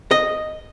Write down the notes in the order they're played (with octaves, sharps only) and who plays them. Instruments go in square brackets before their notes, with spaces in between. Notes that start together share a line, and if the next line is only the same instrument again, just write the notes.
[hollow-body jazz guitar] D#5